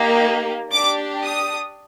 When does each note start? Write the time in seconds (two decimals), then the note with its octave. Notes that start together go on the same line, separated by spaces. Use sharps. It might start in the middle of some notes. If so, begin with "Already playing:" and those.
Already playing: A#3 D#4 G4
0.71 D4 G4 D6
1.24 D#6